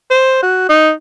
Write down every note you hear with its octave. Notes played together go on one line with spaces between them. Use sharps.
C5
F#4
D#4